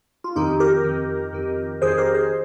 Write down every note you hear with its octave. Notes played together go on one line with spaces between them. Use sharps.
F4
F2 D#3 D#4 G4
G4 A#4
F2 D#3
F2 D#3
F2 D#3 G#4 C5
G4 A#4
G#4 C5